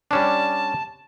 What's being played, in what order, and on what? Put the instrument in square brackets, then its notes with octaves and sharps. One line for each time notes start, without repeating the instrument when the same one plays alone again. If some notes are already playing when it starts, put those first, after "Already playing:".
[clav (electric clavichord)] G3 C#4 D4 [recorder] A5